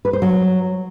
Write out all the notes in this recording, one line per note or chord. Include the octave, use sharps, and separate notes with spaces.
B4
C5
F#3